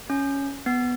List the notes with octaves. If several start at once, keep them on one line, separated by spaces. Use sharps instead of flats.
C#4
B3